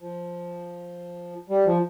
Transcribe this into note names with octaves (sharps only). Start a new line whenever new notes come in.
F3
G3
F3